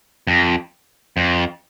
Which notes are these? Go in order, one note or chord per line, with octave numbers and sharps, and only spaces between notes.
F2
F2